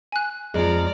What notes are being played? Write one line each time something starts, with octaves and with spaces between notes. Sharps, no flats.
G#5 F#6
F2 F3 G#3 D5 A#5